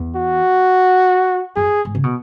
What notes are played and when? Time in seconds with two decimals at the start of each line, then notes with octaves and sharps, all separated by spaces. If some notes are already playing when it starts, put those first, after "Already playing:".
Already playing: E2
0.16 F#4
1.56 F#2 G#4
1.85 G#2
1.95 C#3
2.03 B2